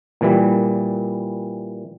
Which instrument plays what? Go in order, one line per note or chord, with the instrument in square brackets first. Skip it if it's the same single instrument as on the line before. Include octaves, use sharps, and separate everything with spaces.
[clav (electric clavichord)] A#2 E3 G3